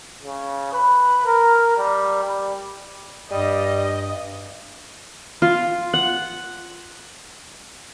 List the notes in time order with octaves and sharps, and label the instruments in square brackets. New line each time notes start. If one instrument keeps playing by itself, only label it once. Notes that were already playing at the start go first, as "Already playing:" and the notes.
[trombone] C#3
B4
A#4
G3
G3
[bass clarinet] G2 [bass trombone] G3 [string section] D#5
[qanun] F4
F#5